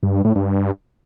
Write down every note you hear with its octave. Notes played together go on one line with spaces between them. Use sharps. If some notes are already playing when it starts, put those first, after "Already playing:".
G2
G2
A2
G2